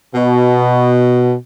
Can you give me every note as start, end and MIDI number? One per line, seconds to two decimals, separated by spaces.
0.15 1.35 47